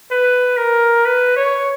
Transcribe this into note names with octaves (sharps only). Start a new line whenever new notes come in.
B4
A#4
B4
C#5